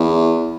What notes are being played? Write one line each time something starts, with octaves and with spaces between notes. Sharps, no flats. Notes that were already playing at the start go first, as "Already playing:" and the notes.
Already playing: E2